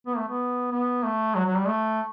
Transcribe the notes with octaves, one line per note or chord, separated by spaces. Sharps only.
B3
A3
B3
B3
A3
F#3
F#3
G3
A3